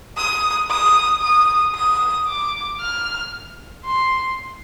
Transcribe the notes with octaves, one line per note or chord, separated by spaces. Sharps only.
D#6
D#6
D#6
D#6
D6
F6
C6